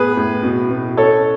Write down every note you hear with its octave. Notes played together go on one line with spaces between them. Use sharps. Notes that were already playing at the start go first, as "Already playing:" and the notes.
Already playing: A2 B3 G#4 B4
A2
B2
B2
C#4 A4 C#5